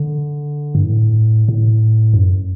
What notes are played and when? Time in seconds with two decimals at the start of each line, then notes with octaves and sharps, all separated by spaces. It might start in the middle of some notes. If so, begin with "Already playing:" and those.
Already playing: D3
0.75 G2
0.84 A2
1.48 A2
2.14 F#2